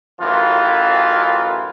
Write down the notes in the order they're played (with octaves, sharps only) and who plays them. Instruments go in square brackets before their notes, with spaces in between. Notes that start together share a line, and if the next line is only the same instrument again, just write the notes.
[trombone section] A1 F#2 D#3 E3 F4